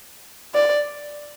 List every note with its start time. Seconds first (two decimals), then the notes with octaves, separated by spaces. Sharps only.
0.55 D5